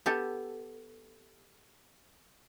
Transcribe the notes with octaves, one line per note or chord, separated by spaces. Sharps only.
B3 G4 A4